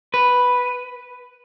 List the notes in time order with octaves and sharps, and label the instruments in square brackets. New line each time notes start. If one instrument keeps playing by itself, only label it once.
[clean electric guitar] B4